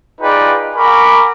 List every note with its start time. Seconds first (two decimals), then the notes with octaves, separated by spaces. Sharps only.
0.21 D#4 F4 G#4 B4 D5 G5
0.76 A#4 F#5 G#5 B5 C#6 D6